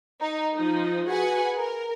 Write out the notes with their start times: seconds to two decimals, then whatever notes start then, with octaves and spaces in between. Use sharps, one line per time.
0.21 D#4
0.56 F3 D#4
1.07 F#4 G#4 B4 F#5 G#5
1.58 A#4